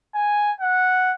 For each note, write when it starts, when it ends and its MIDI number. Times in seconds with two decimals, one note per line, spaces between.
0.15 0.52 80
0.61 1.15 78